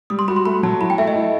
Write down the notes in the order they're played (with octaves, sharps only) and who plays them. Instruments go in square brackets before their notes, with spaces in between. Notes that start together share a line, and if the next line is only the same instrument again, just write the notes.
[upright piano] G3 [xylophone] D#6
[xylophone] C6
[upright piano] F#4 [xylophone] B5
[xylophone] C6
[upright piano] A3 [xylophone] B5
[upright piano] F#3 [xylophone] A5
[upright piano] E4 [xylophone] B5
[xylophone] G5
[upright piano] A3 [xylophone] E5
[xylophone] D#5
[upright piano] E4